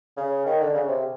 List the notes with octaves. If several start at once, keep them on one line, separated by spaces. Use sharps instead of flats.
C#3
D#3
D3
C#3
C3